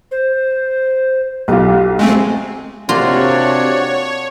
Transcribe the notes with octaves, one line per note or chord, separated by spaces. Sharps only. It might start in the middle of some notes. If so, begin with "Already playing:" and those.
C5
B1 F4 G4
G#3 A3 C4 G#5
C3 A#3 D4 F4 F#4 C#5 D5